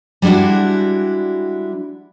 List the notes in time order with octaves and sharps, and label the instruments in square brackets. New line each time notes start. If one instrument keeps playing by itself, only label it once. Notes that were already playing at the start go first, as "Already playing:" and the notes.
[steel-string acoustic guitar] G3 G#3 D4 E4 F#4